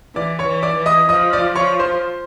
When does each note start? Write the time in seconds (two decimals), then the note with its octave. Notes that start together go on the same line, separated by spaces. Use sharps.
0.15 E3 D5 D6
0.39 C#5 C#6
0.47 E3
0.63 D5 D6
0.78 E3
0.86 D#5 D#6
1.09 F3 D#5 D#6
1.33 D5 D6
1.56 F3 C#5 C#6
1.79 C5 C6